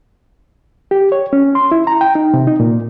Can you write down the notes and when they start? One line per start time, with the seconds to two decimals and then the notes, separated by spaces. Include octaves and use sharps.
0.91 G4
1.12 C#5
1.33 C#4
1.55 C6
1.71 E4
1.87 A#5
2.01 G5
2.15 D#4
2.34 C3
2.47 D#4
2.60 A#2